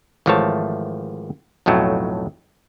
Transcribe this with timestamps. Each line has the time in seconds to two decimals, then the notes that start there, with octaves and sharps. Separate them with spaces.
0.26 G#1 E3 F3 A3 C#5 A5
1.66 B1 F2 A2 F#3 A3